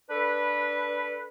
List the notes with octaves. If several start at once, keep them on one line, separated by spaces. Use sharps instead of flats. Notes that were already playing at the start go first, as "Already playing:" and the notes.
D4 A4 B4